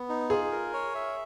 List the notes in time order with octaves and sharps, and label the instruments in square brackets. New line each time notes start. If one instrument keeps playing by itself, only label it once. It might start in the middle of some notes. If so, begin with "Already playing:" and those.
Already playing: [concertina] B3
D#4
[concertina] F4 [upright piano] G#4
[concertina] A#4
C#5
E5